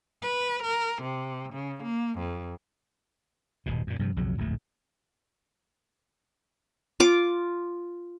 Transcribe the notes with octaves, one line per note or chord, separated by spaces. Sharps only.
B4
A#4
C3
C#3
A#3
F2
D#1 G#2 B2
F#2 A#2
G2 C3 F3
B1 F2 C#3 F#3
D1 A#1 F2 A3
F4 D6